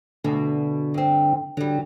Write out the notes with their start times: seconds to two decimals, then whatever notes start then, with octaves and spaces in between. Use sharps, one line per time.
0.24 D2 B2 D3
0.94 G2 C4
1.57 D3 F#3 G3